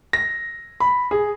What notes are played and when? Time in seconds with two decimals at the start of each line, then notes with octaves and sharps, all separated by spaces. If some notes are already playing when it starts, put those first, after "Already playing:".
0.13 A#6
0.80 B5
1.11 G#4